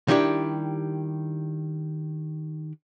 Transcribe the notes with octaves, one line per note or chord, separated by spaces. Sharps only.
D#3 G3 D4 E4 G4